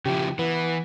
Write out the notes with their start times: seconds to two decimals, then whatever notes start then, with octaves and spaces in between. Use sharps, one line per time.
0.05 C#3 F3 E4 G4
0.39 E3 B3